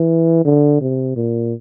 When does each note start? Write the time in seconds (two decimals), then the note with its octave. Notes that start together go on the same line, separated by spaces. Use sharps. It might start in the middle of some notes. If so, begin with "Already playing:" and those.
Already playing: E3
0.45 D3
0.81 C3
1.16 A#2